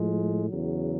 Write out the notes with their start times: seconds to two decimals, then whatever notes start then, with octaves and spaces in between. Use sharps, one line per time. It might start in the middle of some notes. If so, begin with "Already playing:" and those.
Already playing: A2 F3 G#3
0.49 E2 C#3 F#3